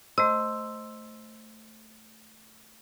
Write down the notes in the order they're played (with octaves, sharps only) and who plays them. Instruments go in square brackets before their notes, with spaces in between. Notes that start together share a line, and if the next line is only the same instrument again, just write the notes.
[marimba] A3 D#5 [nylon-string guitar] C5 [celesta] E6